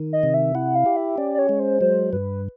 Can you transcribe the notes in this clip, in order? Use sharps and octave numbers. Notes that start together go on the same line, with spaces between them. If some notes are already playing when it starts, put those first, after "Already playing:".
Already playing: D#3
D#5
C3
E5
E4 F#5
F5
G4
E5
C#4 D5
D5
C#5
G#3
C5
F#3 C5
G2 B4